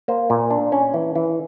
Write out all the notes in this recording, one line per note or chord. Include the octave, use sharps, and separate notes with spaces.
A#3 C5
A#2
D4
C#4
E3
E3